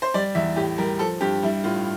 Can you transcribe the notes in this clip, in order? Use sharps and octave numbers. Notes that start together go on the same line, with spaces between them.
C5
G3 D5
E2 E5
A2 G4
G3 A#4
F3 A4
G2 G4
G3 E4
A2 F4